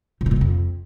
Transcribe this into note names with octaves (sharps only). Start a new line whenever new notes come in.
C3
C#3
A#2
C3
F2